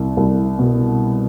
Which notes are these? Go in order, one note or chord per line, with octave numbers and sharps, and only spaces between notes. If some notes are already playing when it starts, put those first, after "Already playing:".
Already playing: C2
C2
B2